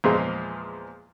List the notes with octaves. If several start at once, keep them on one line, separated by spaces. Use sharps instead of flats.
E2 A#2 F3 G#3